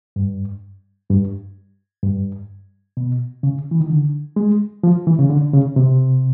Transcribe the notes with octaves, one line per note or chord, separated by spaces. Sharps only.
G2
G2
G2
B2
C#3
E3
D#3
D3
G#3
F3
E3
C#3
D3
C#3
C3